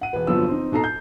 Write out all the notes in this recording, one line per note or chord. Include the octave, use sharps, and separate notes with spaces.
F#5 D#7
E1 B4
G1 F2 F3 F#3 B3 E6
C4 D#4
B2 D#4 A4 A#5 C7
G6